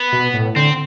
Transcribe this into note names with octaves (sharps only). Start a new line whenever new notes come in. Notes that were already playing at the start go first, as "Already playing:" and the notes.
Already playing: B3
B2
A2
D3 C4